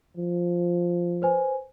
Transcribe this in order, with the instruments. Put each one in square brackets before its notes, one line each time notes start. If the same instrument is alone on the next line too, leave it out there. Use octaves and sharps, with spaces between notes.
[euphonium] F3
[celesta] B4 C5 G#5